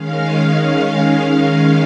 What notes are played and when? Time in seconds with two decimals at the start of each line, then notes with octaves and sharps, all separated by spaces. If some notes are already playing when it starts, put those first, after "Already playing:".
Already playing: D#3 G#3 C#4 F5
1.13 F5